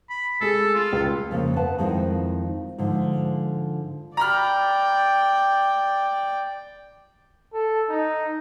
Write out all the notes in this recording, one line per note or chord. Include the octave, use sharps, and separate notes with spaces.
B5
G#3 G#4 A4
F4
C#2
F2 C#3 A#3
B4 F#5 A5
F2 D#3 G#3 C4 E4 F4
G#2 D3 F3
D5 G5 A#5 B5 F6
A4
D#4